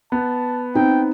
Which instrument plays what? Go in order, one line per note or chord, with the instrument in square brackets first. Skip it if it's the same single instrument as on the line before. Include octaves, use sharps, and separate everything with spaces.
[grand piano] B3 [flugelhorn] A5
[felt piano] C4 D#4 [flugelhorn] G5